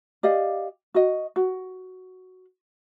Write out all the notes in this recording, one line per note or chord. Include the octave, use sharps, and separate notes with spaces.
G4 D5 D#5 F5
F#4 D#5
F#4